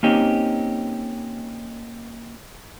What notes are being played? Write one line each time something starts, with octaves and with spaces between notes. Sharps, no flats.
A#3 C4 C#4 D#4 G4